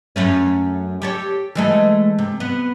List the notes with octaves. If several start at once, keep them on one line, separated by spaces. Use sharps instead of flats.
F#2 A3 C#4
G4 A4 C#5
E3 G#3 A3
C3
B3